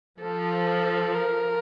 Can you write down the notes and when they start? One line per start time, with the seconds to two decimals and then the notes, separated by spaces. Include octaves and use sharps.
0.21 F3 A4
1.14 A#4